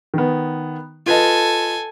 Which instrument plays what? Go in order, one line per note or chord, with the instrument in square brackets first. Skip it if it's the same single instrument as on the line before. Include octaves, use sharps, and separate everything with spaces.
[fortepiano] D#3 B3
[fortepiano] F4 B4 D#5 [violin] A4 G#5